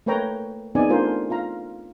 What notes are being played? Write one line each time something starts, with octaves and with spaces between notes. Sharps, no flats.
A3 A#3 B4 C#5 G5 A#5
B3 C4 D#4 G#4 D5 G#5
A3 D4 F4 A#4 C5
F4 F5 A#5